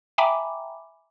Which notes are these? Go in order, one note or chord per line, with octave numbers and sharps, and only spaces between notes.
E5 G5 G#5 A#5 B5 D6